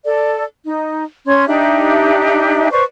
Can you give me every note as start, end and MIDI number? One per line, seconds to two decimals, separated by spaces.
0.04 0.44 69
0.04 0.44 74
0.65 1.04 63
1.27 1.47 61
1.27 1.47 84
1.27 1.47 92
1.48 2.71 62
1.48 2.71 63
1.48 2.71 67
1.48 2.71 76
2.71 2.83 71
2.71 2.83 72
2.71 2.83 74
2.71 2.83 85